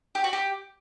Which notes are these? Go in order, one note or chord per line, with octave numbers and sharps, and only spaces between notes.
G4
F#4
G4